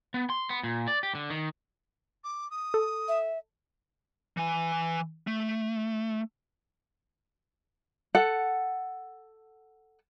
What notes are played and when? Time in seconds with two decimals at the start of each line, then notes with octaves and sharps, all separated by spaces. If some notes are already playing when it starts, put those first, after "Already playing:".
0.14 B3
0.30 C6
0.49 B3
0.63 A#2
0.88 D5
1.03 G4
1.15 D3
1.30 D#3
2.24 D6
2.50 D#6
2.74 A4
3.08 E5
4.37 E3 G#5
5.27 A3
8.15 A4 F#5